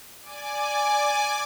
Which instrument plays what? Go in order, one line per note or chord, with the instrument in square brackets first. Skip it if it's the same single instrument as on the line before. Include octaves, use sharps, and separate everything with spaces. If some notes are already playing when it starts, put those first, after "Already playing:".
[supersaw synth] D5 G#5 D6